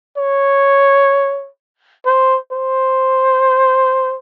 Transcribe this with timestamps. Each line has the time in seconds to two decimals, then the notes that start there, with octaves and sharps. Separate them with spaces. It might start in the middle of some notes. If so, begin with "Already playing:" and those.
0.17 C#5
2.06 C5
2.52 C5